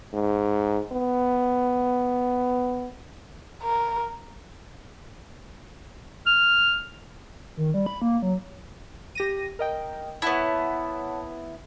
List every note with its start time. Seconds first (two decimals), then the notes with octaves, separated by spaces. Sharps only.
0.13 G#2
0.92 B3
3.63 A#4
6.26 F6
7.57 D#3
7.74 G3
7.86 B5
8.02 A#3
8.22 F#3
9.15 G4 A#6 D#7
9.59 A#4 D#5 G5
10.22 B3 E4 C#5 F#5 A5